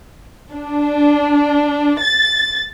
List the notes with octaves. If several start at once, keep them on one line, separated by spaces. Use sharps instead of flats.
D4
A6